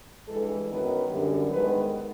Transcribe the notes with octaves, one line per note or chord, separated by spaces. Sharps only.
G2 E3 G#3 A4
F#2 D#3 F#3 B3 D#4 B4
F#2 D3 G3
G#2 D#3 G#3 B3 B4